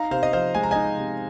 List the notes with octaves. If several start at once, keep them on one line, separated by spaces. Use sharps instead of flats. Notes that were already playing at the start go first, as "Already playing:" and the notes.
Already playing: D#4 F5 A#5
C3 C5 F5
D#5
F3 C5 F5
G#3 G#5
A#5
D#4 D#5 G#5
C3